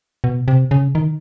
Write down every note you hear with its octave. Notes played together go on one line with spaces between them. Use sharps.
B2
C3
C#3
D#3